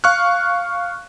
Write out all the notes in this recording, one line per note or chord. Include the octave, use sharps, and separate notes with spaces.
F5 C#6 F6 F#6